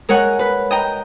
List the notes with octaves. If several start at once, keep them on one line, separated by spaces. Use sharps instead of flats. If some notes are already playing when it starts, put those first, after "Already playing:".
G#3 A#4 C#5 D#5 F#5
B4
D#5 G5 A#5